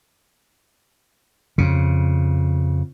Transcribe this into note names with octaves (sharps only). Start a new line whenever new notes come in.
F2 C#3